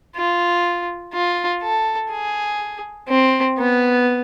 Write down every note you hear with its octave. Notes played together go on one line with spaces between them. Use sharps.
F4
F4
A4
G#4
C4
B3